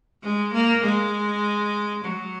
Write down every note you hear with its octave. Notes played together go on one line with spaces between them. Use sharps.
G#3
A#3
G#3
F#3